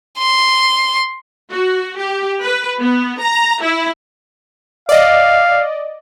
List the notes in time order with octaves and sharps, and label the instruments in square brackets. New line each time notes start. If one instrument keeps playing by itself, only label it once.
[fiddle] C6
[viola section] F#4
G4
B4
B3
A#5
E4
[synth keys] D5 D#5 [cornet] F5